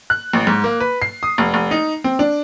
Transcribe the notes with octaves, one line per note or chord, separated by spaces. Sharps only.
F#6
A1
G#2
A#3
B4
C7
D#6
F1
F1
D#4
C4
D4